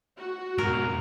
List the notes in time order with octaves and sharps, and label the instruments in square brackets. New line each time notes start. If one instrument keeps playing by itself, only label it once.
[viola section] F#4
[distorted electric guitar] G#2 B2 [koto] A#4